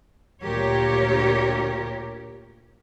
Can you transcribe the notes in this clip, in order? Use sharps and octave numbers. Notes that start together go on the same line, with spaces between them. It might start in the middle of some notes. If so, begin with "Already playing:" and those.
D2 A#2 G4 A#4 C#5